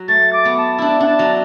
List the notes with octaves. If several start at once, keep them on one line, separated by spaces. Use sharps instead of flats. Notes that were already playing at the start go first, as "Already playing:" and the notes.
Already playing: F#3
A3 A6
D6
B3
A5
D4 E4 A5
D4 F#5
A5
F#3